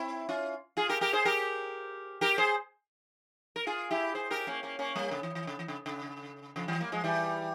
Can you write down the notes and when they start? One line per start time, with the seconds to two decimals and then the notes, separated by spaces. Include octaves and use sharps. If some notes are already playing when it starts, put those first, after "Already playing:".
Already playing: C4 E4
0.29 C#4 F4
0.77 F4 G#4
0.89 G4 A#4
1.01 G4 A#4
1.13 G#4 C5
1.25 G4 A#4
2.21 G4 A#4
2.38 G#4 C5
3.56 A#4
3.67 F4 G#4
3.91 E4 G4
4.15 G#4 C5
4.31 G4 A#4
4.47 A#3 C#4
4.63 A#3 C#4
4.79 A#3 C#4
4.96 G3 A#3
5.11 C#3
5.23 E3
5.35 E3
5.47 C#3
5.59 E3
5.68 C#3
5.86 C#3
6.56 C#3 F3
6.68 E3 G3
6.80 G3 A#3
6.92 F3 G#3
7.04 E3 G3